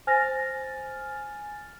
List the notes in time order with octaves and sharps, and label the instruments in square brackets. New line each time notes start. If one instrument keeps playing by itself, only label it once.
[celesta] C5 A#6 [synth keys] G#5 F6 A6